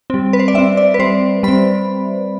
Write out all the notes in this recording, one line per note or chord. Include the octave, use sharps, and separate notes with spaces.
G3 C4
B4
C5
D5
G3 C4 E5
D5
B4
G3 C4 C5
G3 C4 B5